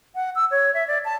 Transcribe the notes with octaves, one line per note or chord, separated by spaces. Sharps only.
F#5
E6
C#5
E5
D5
A5